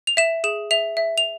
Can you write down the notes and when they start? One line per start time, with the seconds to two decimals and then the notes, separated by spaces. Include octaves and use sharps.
0.07 F7
0.17 E5 E7
0.44 G#4 E7
0.71 E5 F7
0.97 E5
1.18 F7